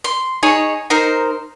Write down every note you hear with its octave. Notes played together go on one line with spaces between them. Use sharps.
C6
D#4 G#4 C#5
D#4 A#4 C5